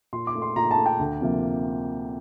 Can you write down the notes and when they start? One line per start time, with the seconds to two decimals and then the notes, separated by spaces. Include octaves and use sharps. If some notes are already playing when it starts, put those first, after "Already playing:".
0.13 A#2 C6
0.27 D6
0.35 A3
0.42 C6
0.56 A#2 A#5
0.71 A5
0.78 A3
0.86 G5
0.99 D2
1.21 C3 F3 A#3